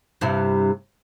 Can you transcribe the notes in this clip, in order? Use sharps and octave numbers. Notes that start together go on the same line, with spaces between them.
G2 C3 E4